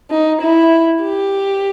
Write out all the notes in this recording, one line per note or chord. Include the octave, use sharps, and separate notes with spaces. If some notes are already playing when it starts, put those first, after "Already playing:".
D#4
E4
G4